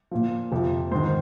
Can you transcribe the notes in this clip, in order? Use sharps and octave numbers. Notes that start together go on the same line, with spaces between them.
A#2 F3
F2 C3 F3
G#2 D#3 C5